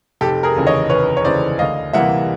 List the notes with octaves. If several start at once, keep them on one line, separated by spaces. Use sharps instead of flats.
F1 G4 A4
G#4 A#4
D#2 C#3 E3
C#5 D#5
F1 B4 C#5
C#5
D#2 C#3 E3 C5 D5
D2 D#5 F5
C3 E3 G3 A#3 E5 F#5